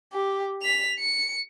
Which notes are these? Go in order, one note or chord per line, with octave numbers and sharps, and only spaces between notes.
G4
B6 F7
C#7